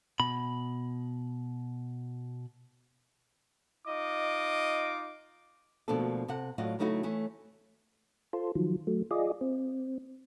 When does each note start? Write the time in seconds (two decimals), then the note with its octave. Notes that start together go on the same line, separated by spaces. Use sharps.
0.20 B2 B5
3.88 D#4 F4 D#5 D6
5.88 D2 B2 F3 A#3 D4 A4
6.28 C3 A4 F#5
6.58 A2 F#3 F4 D5 D#5 F#5
6.79 C#3 F#3 A3 D#4 E4 F#4
7.03 E3 A3 C#4
8.33 F4 A4 C5
8.55 D#3 F3 F#3
8.87 F#3 A3
9.11 F4 G#4 D5 D#5
9.41 C4